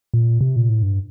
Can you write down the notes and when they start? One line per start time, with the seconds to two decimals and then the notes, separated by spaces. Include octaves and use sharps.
0.14 A#2
0.41 C3
0.56 A#2
0.69 A2
0.82 G2